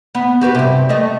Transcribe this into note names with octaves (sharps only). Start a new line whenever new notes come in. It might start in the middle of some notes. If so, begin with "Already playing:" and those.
B3
F#4 G4 B4
G2 C3
A3 D#5